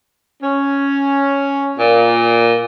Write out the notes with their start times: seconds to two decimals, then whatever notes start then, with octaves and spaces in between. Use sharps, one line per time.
0.42 C#4
1.78 A#2